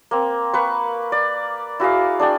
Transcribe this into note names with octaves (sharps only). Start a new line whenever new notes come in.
A#3 C4
A#3 B4 C#6
D5
E4 F#4 G#4 F5
D4 G#4 D5 G5